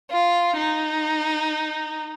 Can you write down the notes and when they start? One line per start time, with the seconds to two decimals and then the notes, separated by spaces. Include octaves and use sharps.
0.11 F4
0.57 D#4